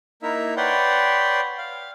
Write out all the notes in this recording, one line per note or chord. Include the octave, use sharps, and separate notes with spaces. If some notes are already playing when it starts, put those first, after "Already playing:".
A#3 D#4 E4 E5
B4 C#5 D5 F#5 G5 C6
F5